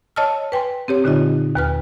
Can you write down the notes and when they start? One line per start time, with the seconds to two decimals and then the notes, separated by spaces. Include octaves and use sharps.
0.16 C#5 D#5 A5 E6 F6
0.52 B4 G5 G#5 C6
0.88 C4 G4 C#5
1.04 A#2 D3 D#4 F4 D#5
1.55 D#2 B4 F6